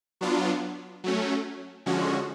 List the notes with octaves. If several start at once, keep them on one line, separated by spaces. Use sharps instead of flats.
F#3 B3 D4 F4
F#3 A3 C#4
D3 F3 G#3 C#4 F#4